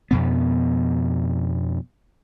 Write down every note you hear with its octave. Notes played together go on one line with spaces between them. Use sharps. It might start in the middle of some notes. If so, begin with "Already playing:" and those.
F2 B2 B3